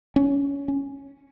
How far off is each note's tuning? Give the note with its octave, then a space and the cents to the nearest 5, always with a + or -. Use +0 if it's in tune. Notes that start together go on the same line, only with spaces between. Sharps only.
C#4 +20
C#4 +0